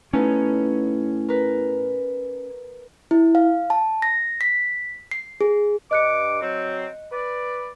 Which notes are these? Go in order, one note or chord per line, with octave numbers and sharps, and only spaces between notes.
A2 A3 B3 C#4 D#4
A#4 B4
E4
F5
A5
A#6
B6
C7
G#4
G2 D#5 D6 F#6 C#7
F#3 C4
B4 D5